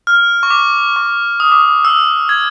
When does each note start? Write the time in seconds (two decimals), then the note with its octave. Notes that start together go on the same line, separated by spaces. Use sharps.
0.07 F6
0.43 C#6
0.50 D6
0.96 C#6
1.40 D#6
1.52 D6
1.62 D#6
1.85 E6
2.29 G#6